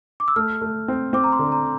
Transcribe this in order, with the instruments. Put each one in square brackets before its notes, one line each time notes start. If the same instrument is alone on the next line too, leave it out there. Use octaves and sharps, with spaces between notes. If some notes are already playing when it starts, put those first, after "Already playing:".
[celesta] D6
E6
[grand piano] A3 [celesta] F6
[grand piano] A3
C4
[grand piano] C4 [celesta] D6
[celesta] A#5
C6
[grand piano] D3
[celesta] A#5